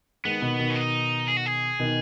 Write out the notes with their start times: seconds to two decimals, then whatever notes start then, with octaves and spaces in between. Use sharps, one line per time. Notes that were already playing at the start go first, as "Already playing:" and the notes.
0.25 D#3 G#3 B3
0.42 B2 D#3
0.59 B2 D#3
0.70 C#4
0.76 D#4
1.28 G#4
1.37 F#4
1.46 G#4
1.79 B2 D#3